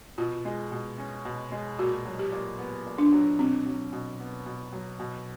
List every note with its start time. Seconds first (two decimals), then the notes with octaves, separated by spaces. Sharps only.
0.18 B2 F4
0.45 G#3
0.72 B2
0.98 C#4
1.25 B2
1.52 G#3
1.79 A#2 F#4
2.05 F#3
2.19 G4
2.32 A#2
2.59 B3
2.86 A#2
2.98 D4
3.13 F#3
3.39 B2 C4
3.66 F#3
3.93 B2
4.20 B3
4.46 B2
4.73 F#3
5.00 B2